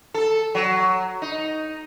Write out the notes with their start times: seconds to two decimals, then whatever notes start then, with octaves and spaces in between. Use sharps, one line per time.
0.14 A4
0.55 F#3
1.22 D#4